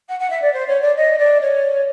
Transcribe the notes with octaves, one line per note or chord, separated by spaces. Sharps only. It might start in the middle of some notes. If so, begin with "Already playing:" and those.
F#5
F#5
E5
D5
C5
C#5
D5
D#5
D5
C#5